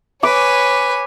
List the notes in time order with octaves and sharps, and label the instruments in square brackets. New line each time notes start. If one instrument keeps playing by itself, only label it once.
[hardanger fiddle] B4 [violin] C#5 G#5 [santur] D6